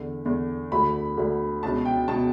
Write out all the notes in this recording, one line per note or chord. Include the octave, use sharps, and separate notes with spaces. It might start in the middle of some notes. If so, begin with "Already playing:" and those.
Already playing: E2 D3
E2 D3
D2 D3 B5
D2 D3
C#2 B2 A5
G5
B2 A5